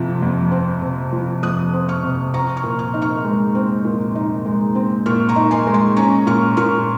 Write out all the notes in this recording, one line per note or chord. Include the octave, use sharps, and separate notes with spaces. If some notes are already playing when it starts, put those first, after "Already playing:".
Already playing: F2 C3 F3 C4
F2
C4
C3
F3
F2 D#6 F#6
C4
C#6 F6
C3
C4 A#5 C#6
C#6 F6
A#2
C#6 F6
D#4
C#6 F6
G#3
C4
A#2
D#4
G#3
C4
A#2 C#6 F6
A#5 C#6
D#4
G#5 C6
G#3
G#5 C6
C#4 A#5 C#6
A#2 C#6 F6
A#2 C#6 F6